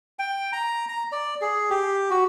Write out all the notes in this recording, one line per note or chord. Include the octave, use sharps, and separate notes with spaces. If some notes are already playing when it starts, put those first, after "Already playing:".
G5
A#5
A#5
D5
G#4
G4
F#4